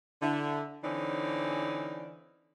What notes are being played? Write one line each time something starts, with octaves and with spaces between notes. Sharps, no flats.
D3 E4
D3 E3 C4 C#4 D#4 D5